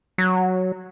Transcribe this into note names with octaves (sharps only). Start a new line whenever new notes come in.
F#3